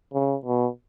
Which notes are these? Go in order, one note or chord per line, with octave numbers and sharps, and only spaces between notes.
C#3
B2